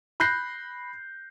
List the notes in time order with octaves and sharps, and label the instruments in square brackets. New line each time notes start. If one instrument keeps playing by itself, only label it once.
[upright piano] B5 F#6 G6 A#6 C7